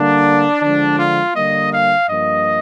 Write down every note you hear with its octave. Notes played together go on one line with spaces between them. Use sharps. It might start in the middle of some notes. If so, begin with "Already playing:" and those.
Already playing: D3 G3 A#3 D4
D3 F3 G#3 D4
F4
D3 G3 A#3 D#5
F5
G2 F3 A#3 D#5